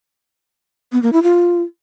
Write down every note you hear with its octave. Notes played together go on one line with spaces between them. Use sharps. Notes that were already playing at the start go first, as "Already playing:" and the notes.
B3
A#3
E4
F4